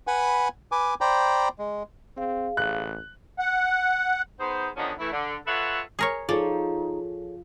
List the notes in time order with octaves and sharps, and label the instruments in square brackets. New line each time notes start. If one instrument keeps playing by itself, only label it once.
[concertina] B4 F#5 G#5 B5
B4 G#5 D6
C5 D5 G5 A#5 B5
G#3
[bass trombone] C4 [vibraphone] G#4 F5
[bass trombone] A1 [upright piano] F#6
[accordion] F#5
[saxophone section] B3 D#4 G#4 C5
D3 D#3 F3 B3 C#4 D#4
E3 A3 E4
D3
F4 A4 B4 C#5 E5 F#5
[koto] G#4 A#4 C#5
[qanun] F3 [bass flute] D#4 [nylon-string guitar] G#4 A4 C#5 [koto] D5